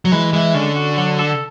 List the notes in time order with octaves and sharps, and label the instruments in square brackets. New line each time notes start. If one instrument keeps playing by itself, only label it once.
[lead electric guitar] F#3
[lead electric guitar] E3 [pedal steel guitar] G#3
[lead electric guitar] E3 [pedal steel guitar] G#3
[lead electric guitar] D3 [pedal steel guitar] C#4
[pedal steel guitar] F#4
F#3
A4